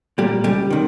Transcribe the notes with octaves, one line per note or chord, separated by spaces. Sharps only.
A#2 G3
C#2 G3
C3 D#3